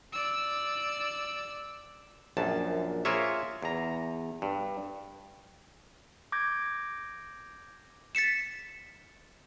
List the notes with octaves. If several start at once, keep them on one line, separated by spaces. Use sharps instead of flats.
D5 E6
A#1 F#2 A5
A#3 F4 G#4 C#5 E5
E2 A#5
G2
D6 G6 G#6 A#6
A6 B6 C#7 E7